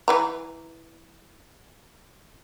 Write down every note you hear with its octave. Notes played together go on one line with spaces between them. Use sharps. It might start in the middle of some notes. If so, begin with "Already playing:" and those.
E3 B4 A#5